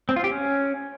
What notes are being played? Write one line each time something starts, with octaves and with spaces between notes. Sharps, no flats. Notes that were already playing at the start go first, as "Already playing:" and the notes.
C4
F4
G4
C#4